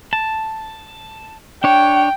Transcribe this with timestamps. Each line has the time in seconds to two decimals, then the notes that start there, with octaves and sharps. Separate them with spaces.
0.13 A5
1.64 D4 C#5 G5